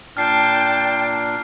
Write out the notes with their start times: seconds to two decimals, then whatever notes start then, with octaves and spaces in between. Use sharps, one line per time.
0.17 A#2 D4 G5 A5 F6 C7